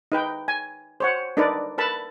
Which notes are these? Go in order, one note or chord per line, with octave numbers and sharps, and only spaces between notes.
D#4 B4 G5
G#5
C5 C#5 F#5
D4 D#4 A#4 B4 D5
A#4 B4 A5 B5